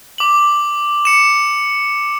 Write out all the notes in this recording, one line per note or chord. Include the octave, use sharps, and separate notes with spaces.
D6 F#7
C#7 E7